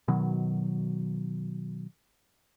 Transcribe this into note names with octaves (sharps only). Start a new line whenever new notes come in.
B2 D#3 F#3